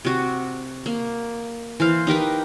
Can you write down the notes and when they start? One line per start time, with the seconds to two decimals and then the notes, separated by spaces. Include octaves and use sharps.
0.05 C3 F#4
0.86 A#3
1.80 E3 C5 F5
2.07 D#4 G4 A#4 B4